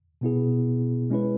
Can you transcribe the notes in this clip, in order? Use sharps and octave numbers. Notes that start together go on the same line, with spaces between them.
B2 B3 E4 G#4
G#3 C#4 E4 B4